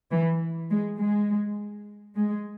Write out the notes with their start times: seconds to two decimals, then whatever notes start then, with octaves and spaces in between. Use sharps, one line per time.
0.11 E3
0.70 G#3
0.99 G#3
2.15 G#3